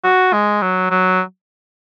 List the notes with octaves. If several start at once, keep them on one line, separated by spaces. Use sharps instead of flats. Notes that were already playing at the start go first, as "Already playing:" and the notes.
F#4
G#3
F#3
F#3